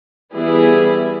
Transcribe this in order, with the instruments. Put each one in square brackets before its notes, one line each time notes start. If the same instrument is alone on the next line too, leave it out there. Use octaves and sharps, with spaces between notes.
[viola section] E3 G3 B3 E4 G#4